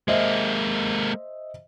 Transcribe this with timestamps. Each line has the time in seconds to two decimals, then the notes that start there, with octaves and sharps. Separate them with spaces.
0.08 G#3 A#3 C5 D#5 E5